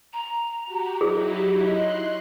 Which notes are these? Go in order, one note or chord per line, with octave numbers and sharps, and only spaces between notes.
A#5
F#4 G4
F#3 D#4 E4 G#4
G4
D#5 C6 F#6